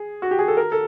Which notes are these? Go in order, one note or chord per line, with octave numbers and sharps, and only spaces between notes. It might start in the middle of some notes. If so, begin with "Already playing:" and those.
Already playing: G#4
F#4
G4
G#4
A4
A#4
A4